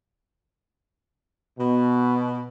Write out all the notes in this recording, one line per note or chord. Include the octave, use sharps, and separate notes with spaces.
B2